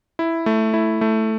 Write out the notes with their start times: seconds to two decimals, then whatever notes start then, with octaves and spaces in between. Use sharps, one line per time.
0.19 E4
0.46 A3
0.74 E4
1.01 A3